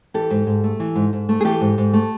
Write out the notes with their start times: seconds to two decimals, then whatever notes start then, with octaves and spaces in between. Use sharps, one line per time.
0.14 E3 G4 A4
0.30 G#2
0.47 G#2
0.64 A3
0.80 E3
0.95 G#2
1.13 G#2
1.29 A3
1.41 G#4
1.45 E3 G4 A4
1.61 G#2
1.78 G#2
1.94 A3